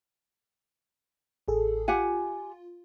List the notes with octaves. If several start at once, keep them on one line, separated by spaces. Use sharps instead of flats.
A1 G#4 A4
F4 G4 F#5 G#5